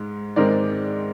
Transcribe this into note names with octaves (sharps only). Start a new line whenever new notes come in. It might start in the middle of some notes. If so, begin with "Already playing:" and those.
Already playing: G#2 G#3
G#2 D#3 G#3 C4 D#4 A#4 D5